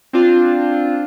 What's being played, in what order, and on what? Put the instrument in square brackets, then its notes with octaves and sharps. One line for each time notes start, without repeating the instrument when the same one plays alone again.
[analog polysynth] C4 D4 F4